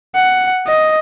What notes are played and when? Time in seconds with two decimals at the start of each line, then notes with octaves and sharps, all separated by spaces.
0.16 F#5
0.67 D#5